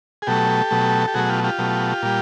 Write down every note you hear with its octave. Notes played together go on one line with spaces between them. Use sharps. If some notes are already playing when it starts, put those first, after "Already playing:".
G#4
B2 F#3 A3 G4 A4
B2 F#3 A3
G4
B2 F#3 A3 F#4 G#4
F4 G4
F4 G4
B2 F#3 A3
A#2 G3